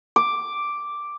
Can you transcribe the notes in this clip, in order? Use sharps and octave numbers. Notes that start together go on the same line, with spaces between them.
D6